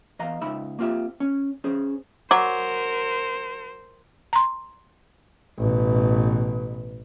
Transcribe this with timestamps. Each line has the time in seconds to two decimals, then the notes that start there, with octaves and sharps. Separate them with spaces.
0.19 E2 D#5 F5 A#5
0.41 C#2 D#4 E5 B5
0.79 A#3 C4 F4 G4 E5
1.20 C#4
1.64 C#4 G#4 C5
2.31 F#3 A#4 C5 D6
4.33 A#5 C6
5.58 A1 B2